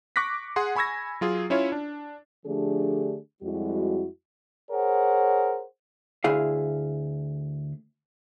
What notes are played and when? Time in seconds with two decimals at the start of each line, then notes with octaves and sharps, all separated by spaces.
0.16 C#6 D6 F#6 A#6 B6
0.56 G#4 F#5 C6
0.76 G#5 B5 C#6 E6 G#6 A#6
1.21 F#3 F4 G#4
1.50 C#4 E4 F4 C#5
1.72 D4
2.46 D3 F3 A3 D4 G4 G#4
3.43 F2 G3 G#3 E4 F#4
4.71 G#4 A#4 C5 C#5 F#5
6.24 D2 E4 G#4 F5